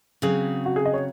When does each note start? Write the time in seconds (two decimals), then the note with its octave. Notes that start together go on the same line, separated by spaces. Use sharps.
0.22 C#3 F#3 C4 G#4
0.66 F#4
0.76 G#4
0.85 D#5
0.94 C#5